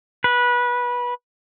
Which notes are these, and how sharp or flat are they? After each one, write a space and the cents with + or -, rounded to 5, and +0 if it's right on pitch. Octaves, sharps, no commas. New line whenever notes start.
B4 -20